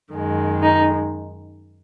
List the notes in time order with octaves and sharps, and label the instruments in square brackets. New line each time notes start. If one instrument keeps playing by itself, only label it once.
[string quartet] F#2 D#3 G#3
D#4